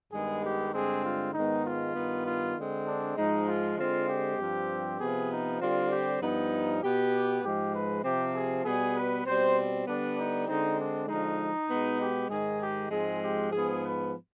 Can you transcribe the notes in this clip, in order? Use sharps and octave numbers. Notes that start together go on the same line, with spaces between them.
G2 D#3 G#3 B3 G#4
G4
G2 D3 G#3 C4 G#4
F4
G#2 D#3 G#3 B3 D#4
F4
G2 D#3 B3
F4
D3 G#3 C4
D4
G#2 F3 G#3 D#4
F4
D3 G#3 C4 F4
G4
G2 F3 C4
C3 F3 B3 G#4
D#4
D3 G3 C4 F4
G4
G2 F3 B3 D#4
B2 B3 G4
G#2 F3 G#3 G4
B4
C3 F3 C4 G4
G#4
B2 G3 B3 G#4
B4
B2 G3 C4 C5
D3 G3 B3 D4
D#4
D3 G#3 C4 D#4
D4
D3 F3 G#3 D#4
B2 G#3 B3
G4
G#2 D#3 G#3 G#4
G4
G#2 F3 G#3 C4 G#4
G4
G#2 F3 B3 G#4
B4